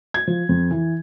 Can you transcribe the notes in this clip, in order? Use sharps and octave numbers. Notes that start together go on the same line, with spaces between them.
G#6
F3
F2
E3